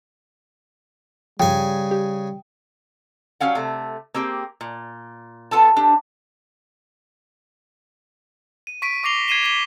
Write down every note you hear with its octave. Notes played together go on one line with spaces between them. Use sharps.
G2 C#3 F3 G3 G5 G#5
G4
F#3 G3 C#4 F5 F#5
C3 A3
A#3 C4 G4 G#4
A#2
B3 F4 A4 A5
D4 G4
D#7
C#6 B6 D7 D#7
C#6 D6 A#6 C7 F7 G7
G#6 C7 D#7 E7 G7
G#6 B6 G7